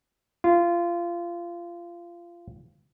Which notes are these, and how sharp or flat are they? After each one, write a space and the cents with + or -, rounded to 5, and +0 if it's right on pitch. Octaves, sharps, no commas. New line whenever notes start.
F4 -20